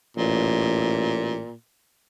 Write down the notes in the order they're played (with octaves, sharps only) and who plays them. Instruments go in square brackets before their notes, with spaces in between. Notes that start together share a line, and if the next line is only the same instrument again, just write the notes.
[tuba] A1 [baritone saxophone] A#2